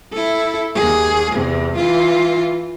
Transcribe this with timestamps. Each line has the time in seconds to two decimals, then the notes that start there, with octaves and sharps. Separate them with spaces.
0.13 E4 A4
0.75 D#2 G#4
1.34 E2 C3
1.76 E3 F4